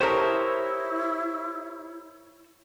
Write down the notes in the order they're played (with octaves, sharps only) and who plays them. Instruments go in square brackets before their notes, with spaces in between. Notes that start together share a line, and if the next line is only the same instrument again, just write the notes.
[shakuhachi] E4 [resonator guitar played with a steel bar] G4 A#4 [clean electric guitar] C5 C#5 D#5